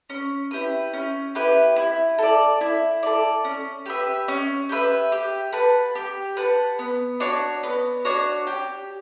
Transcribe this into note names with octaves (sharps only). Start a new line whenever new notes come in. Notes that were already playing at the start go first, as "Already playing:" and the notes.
C#4
E4 G4 B4
C#4
E4 G4 B4
E4
A4 D5
E4
A4 D5
C#4
G4 B4 E5
C#4
G4 B4 E5
G4
B4 F#5 A5
G4
B4 F#5 A5
B3
D4 F#4 C#5
B3
D4 F#4 C#5
G4